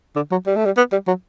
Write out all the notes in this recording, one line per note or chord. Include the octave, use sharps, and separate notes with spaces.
D3
F#3
G3
A3
G3
B3
G3
F#3